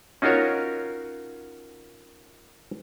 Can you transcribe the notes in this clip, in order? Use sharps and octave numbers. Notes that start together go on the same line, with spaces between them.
C#4 D#4 F4 F#4 A#4 C#5